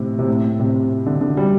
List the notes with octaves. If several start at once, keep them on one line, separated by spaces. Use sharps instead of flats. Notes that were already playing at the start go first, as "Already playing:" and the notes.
Already playing: A2 C3
C3
A2
C3
D3
D3
G3